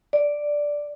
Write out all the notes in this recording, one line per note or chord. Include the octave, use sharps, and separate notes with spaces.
D5